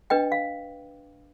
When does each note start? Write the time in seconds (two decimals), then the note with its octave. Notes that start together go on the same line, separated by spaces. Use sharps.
0.10 D4 B4 D#5 G5
0.32 F5